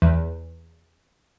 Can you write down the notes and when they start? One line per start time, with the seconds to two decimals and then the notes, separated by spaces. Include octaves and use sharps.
0.02 E2